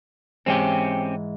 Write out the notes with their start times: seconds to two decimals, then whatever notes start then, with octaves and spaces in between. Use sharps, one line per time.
0.46 G#2 E3 C4 C#4 G4